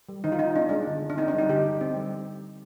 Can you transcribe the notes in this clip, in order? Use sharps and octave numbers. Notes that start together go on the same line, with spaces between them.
G3
D#3 D#4
F4
D#3 D#4
B3 D4
G#3 D4
D3
D3
D4
C4 D#4
D4
G3
D#4
D3 G4
D3
C4
G3